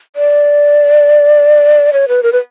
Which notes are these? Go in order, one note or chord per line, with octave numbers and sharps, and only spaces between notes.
D5
C#5
B4
A#4
B4